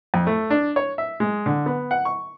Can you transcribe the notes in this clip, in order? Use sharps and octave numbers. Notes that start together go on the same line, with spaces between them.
F2
A3
D4
C#5
E5
G#3
D3
B3
F#5
C#6